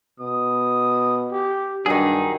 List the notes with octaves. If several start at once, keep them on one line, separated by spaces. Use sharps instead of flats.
B2 D#6
G4
G2 D#3 F#3 D4 D#4 G#4